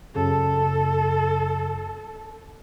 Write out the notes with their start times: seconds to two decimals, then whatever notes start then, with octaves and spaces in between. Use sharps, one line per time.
0.15 F#2 C#3 A4